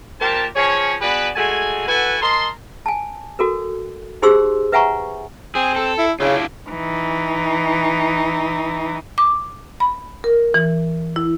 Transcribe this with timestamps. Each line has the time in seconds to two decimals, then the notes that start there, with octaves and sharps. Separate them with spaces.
0.21 A#2 G4 A#4 C5 A5
0.55 F3 C#4 G#4 C#5
1.01 B3 D4 F#4 G#4 B4
1.36 G#3 A3 F#4 G#5
1.88 E4 F#4 A4 B4 F#5 G#5
2.22 A#4 D#5 A5 C6
2.86 G#5 A5
3.39 F#4 A4 A#4
4.22 D#4 G4 G#4 C5 C6 E6
4.72 B4 E5 F#5 G#5 A#5 C#6
5.55 C4 G#4
5.76 A4
5.98 E4
6.20 C#3 D4 E4 F4
6.70 E3 D#4
9.18 D6
9.80 B5
10.24 A#4
10.54 E3
11.16 E4